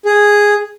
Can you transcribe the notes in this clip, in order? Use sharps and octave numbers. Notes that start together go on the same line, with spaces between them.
G#4